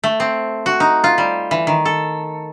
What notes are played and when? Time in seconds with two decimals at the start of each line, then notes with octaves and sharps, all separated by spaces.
0.04 A3
0.20 C4
0.66 F#4
0.80 D#4
1.04 F4
1.18 G3
1.51 E3
1.67 D#3
1.85 A4